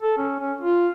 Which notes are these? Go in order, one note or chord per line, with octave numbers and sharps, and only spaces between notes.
A4
C#4
C#4
F4